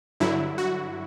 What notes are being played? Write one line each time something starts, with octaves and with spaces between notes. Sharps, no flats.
G2 D3 F#3 E4
F#4